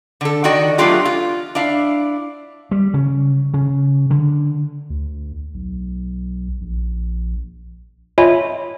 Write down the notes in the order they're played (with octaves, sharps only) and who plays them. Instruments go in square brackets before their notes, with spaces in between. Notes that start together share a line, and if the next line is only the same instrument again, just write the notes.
[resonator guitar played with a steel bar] D3 A4
D#3 D#4 F#4 D5 G5
F#3 A3 B3 D4 F4 G4
F4
D4 E4 F5
[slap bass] G3
C#3
C#3
D3
[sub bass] D2
B1
A#1
[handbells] F4 C#5 D#5 E5 G#5 B5